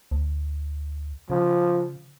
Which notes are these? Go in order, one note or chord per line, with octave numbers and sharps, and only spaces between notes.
D2
C#3 F3